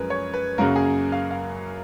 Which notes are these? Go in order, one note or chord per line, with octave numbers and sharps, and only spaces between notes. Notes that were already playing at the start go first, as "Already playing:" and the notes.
Already playing: F#2 F3 G#3 C#4 G#4 A#4 B4
C#5
B4
F#2 C#3 F#3 A#3 A#4
G#4
F5
F5